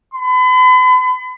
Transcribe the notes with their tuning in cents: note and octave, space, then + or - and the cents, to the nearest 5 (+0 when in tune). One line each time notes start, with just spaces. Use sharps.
B5 +40